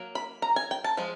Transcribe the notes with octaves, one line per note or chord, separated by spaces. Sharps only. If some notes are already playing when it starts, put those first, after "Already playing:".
Already playing: F#3 A#3
B5
A#5
G#5
G5
A5
F3 G#3